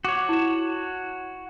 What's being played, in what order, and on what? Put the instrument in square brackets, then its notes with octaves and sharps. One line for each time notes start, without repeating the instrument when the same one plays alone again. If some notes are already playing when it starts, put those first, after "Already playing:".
[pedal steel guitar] F#4 C#5 [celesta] D6
[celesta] E4 E7